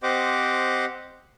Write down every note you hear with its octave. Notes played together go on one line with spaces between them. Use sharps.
C4 G4 C5 D#5 F#5 D6